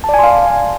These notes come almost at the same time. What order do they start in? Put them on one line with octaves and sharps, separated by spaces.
A5 D5 G#5 C6 F5